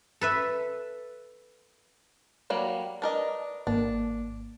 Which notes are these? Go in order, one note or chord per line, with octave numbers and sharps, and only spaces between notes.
A4 B4 E5
F#3 G3 A#3
D4 A#4 B4 D5 D#5
G#1 A#3 D4